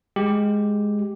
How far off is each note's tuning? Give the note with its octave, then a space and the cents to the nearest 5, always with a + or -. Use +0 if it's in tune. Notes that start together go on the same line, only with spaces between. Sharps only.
G#3 +0 G4 +0